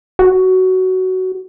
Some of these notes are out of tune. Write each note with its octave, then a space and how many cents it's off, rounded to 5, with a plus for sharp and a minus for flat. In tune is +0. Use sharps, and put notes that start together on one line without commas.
F#4 +15